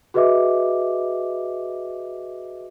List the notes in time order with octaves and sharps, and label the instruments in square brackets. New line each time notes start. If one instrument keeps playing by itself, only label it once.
[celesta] F#4 G#4 B4 D#5 E5 D6